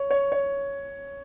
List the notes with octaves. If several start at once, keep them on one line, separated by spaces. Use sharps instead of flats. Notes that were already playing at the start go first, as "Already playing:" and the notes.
Already playing: C#5
C#5
C#5